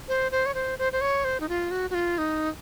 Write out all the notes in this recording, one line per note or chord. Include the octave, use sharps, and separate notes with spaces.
C5
C5
C#5
C5
C5
C5
C#5
C5
D#4
F4
F#4
F#4
F4
D#4